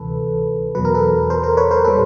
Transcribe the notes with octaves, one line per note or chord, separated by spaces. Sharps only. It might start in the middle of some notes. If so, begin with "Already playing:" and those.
Already playing: D2 C3 E3 A4 B4
E2 B2 F#3 B4
A#4
A4 B4
A#4 C5
A#4 C5
B4 C#5
A#4 C5
A#2 G3 A4 B4